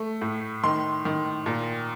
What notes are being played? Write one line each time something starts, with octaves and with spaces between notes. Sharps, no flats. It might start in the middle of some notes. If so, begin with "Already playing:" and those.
Already playing: A3
A2
D#3 C6
D#3
A#2